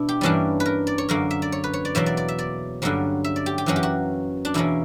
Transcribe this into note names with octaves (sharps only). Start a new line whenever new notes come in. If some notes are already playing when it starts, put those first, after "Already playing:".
Already playing: B2 D4 E4
G4
G2 E3 G3 A#3 C#4 D4
B4
A#4
D5
C#5
F#2 D3 A#3 A#4
E5
D5
C#5
B4
C#5
D5
E2 B2 F#3 A#3 E5
D5
D5
E5
D5
G2 D3 F#3 A#3 C#4
E5
D5
G4
G4
F#2 E3 A#3 C#4 F#4
G4
F#4
D4
E2 B2 A#3 C#4 E4